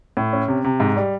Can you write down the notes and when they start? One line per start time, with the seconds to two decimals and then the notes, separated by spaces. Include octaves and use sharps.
0.17 A2
0.33 C#4
0.48 C3
0.64 C3
0.80 G#2
0.96 G3